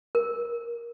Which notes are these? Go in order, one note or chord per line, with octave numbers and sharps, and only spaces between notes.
A#4